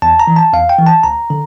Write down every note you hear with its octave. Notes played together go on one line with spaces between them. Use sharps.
E2 A5
A#5
E3
A5
E2 F5
G5
E3
A5
D2 A#5
D3